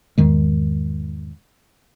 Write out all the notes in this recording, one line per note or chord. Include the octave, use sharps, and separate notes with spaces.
E2 G#2 D#3 G#3